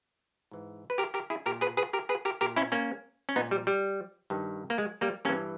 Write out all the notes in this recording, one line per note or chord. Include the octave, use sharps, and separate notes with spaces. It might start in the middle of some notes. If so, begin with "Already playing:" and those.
G#2 E3
B4
G4 A#4
G4 A#4
E4 G#4
A#2 G4 A#4
G#4 B4
G#4 B4
G4 A#4
G#4 B4
G4 A#4
A#2 G4 A#4
C#4 E4
A#3 C#4
C#4
A#2 B3 D#4
G3
G3
G2 D#3
A#3
G#3
G3 A#3
G2 E3 A#3 C#4